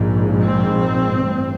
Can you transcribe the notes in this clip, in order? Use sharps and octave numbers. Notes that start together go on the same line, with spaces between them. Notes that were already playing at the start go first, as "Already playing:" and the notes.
Already playing: A#1 G#2
C4
A1 G2